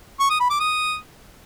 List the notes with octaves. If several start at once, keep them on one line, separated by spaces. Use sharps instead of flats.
C#6
D#6
B5
D6
D#6